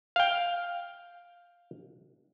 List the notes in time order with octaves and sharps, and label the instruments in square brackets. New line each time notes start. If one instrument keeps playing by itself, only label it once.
[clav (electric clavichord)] F5 G5